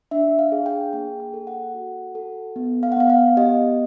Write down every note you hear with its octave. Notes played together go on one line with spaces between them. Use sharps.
D4 E5
F5
G#4
G5
A#3 G5
G5
A4
F#5
F#4
A4
B3
F5
F#5
B3 F5
F5
G4 D#5